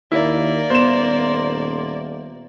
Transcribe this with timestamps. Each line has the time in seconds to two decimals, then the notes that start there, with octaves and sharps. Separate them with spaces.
0.12 D#2 A#3 E4 D5
0.70 D#1 B3 C5 E7